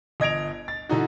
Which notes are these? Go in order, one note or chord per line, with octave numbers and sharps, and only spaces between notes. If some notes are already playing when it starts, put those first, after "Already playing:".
G1 D#5 G#6 D7 F7
A6
D3 E3 D#4 F#4